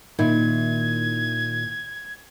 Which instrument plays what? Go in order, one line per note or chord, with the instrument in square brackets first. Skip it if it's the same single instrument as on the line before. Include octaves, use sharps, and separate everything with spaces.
[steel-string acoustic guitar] A#2 [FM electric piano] D#3 E4 [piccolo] G#6